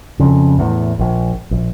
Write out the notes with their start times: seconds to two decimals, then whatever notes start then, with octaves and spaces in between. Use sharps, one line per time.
0.19 F2 C#3
0.59 E2 A2
0.99 A#1
1.51 A#1